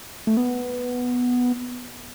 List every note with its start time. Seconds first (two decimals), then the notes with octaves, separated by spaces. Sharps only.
0.27 A3
0.37 B3